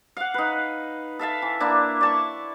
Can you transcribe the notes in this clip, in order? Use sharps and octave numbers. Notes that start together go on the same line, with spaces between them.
F5 F#5
D#4 B4
A4 E5 F5 A5
E3
A#3 D4 E4
D5 A5 C#6